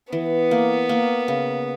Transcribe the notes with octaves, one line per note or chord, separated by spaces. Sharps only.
E3 B3
A#3
A#3
C#3